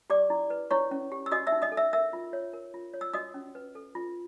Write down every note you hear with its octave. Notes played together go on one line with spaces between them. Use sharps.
G4 D5 D6
E4
B4
E4 C#5 C#6
C#4
G4
E6
F#4 D#5 D#6
E5 E6
D#4
D#5 D#6
A4
E5 E6
A#4 E5 E6
F4
C#5
A#4
F4
C#5
E6
F#4 D#5 D#6
C#4
B4
A4
F4